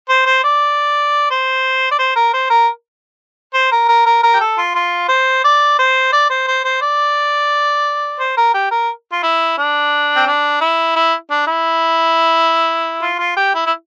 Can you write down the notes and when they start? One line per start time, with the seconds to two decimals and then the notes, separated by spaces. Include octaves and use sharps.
0.09 C5
0.26 C5
0.44 D5
1.30 C5
1.91 D5
1.99 C5
2.16 A#4
2.33 C5
2.50 A#4
3.54 C5
3.72 A#4
3.88 A#4
4.06 A#4
4.23 A#4
4.34 G4
4.40 A4
4.58 F4
4.75 F4
5.09 C5
5.44 D5
5.79 C5
6.13 D5
6.30 C5
6.48 C5
6.64 C5
6.82 D5
8.19 C5
8.37 A#4
8.54 G4
8.71 A#4
9.12 F4
9.23 E4
9.58 D4
10.16 C4
10.27 D4
10.61 E4
10.96 E4
11.30 D4
11.47 E4
13.02 F4
13.19 F4
13.37 G4
13.55 E4
13.66 E4